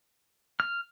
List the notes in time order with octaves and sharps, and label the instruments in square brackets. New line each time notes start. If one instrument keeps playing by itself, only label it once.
[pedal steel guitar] F6